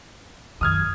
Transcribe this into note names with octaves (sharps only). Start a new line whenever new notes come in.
F#2 D#3 D#6 F6 G#6